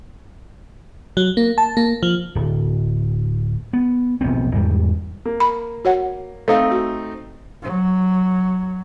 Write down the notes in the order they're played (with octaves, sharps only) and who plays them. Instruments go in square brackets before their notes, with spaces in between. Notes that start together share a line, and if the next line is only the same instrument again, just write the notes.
[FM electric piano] F#3
A#3
A5
A#3
F3
[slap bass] D1
B3
E1 A#1 B3 C4
E2 G#2 C#3 G3
[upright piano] A#3
[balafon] B5
F#4 C#5 F#5
[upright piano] A3 C4 D#4 [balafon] A4 F5
[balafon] F#4
[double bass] F#3